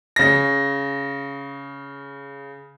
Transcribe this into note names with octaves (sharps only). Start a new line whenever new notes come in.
C#3 A#6